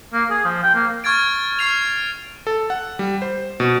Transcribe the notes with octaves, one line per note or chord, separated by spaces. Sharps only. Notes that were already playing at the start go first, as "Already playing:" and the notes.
A#3
G#4
F3
G5
A#3
C#6 F6 G#6 A6 D7
C#6 F6 C7 F7
A4
F#5
G3
C5
B2